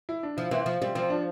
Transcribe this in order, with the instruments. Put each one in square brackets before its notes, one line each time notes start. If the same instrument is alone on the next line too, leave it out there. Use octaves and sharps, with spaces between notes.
[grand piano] E4
D4
[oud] F3 [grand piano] E4
[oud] E3 [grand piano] C4
[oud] F3
[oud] G3 [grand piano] C4
[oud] F3 [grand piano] C4
[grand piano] D4